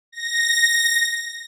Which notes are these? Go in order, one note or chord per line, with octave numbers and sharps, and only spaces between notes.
A#6